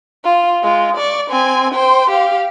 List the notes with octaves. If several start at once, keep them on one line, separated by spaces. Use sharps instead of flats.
F4
G#3 F4
D5 C#6
C4 G#5
C5 G5
G4 F5